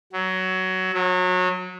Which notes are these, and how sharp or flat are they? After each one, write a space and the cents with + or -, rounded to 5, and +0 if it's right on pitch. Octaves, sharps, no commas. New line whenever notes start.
F#3 +15
F#3 -25